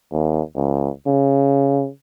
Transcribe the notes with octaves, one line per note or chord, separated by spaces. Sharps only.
D#2
C#2
C#3